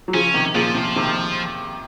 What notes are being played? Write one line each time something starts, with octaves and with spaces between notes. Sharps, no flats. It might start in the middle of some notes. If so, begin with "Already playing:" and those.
F#3
C#3 F3 C#4
C3 D#3
A#2 C#3 F3
C3
C3 D#3